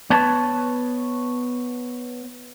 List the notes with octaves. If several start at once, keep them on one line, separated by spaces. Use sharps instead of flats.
B3 B4 C#5 A5